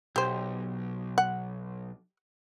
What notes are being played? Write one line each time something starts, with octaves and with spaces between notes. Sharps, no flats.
B1 G4 C5
F#5